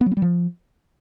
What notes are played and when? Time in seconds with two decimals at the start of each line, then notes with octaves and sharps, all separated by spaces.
0.01 B3
0.06 F#3
0.11 B3
0.17 G3
0.22 F3